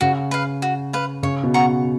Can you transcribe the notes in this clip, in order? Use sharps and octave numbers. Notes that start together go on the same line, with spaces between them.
C#3 F#4
B4 F5
F#4
B4 F5
C#3 C#5
B2
F#5 A#5 C#6